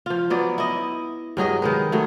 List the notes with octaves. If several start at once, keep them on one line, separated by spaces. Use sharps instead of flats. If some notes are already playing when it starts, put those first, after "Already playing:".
F3 F4
F#3 B3 D5
E4 D#5
G2 F#3 G#4 D#5
D#3 G#3 B4
F#3 A3